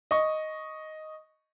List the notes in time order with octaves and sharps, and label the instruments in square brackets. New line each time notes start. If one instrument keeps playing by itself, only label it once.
[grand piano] D#5 C#6